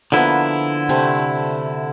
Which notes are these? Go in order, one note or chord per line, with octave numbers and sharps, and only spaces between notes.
D3 F3 A#3 B3 E4
C3 A3 C4